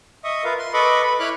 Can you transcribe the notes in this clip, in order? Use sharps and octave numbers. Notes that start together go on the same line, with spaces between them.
D#5 E5 C#6 D#6
F4 A#4 B4 E5 F5
C6
A4 B4 D#5 B5 C#6 D6
B4 B5
E4 C#5 B5 D6 F6 F#6